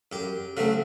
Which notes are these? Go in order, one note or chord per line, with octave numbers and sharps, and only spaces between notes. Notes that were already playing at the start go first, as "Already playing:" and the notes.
F#2 G4
C#3 F#3 A3 C4